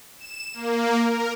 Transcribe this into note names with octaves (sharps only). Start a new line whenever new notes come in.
E7
A#3
A#4